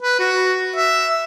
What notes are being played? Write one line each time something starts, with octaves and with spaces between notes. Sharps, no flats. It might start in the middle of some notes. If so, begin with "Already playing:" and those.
B4
F#4
E5